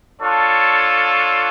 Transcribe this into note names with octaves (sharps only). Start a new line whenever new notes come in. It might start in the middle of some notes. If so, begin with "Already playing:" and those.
D4 F4 A4 C#5